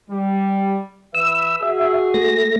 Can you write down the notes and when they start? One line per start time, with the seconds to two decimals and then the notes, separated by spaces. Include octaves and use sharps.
0.11 G3
1.15 E3 B4 E5 E6
1.63 F#4 G#4 E5
2.14 A3 A#6